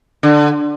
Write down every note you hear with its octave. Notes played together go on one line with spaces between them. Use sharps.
D3